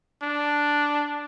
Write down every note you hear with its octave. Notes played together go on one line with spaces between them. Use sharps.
D4